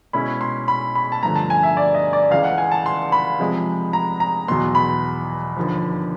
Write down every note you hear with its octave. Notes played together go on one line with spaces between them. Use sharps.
B2 G#3 C#4 E4 B5
C6
B5
B5
A5
G2 D3 F3 A3 A#5
A5
G#5
E5
D5
D#5
D5
C#2 C#3 E3 F5
F#5
G#5
A5
C6
B5
C3 F3 G#3
A#5
A#5
E2 B2 F#3 B3 C6
B5
D#2 D3 F3